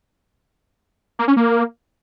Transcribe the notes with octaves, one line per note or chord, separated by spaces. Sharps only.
A#3
C#4
A#3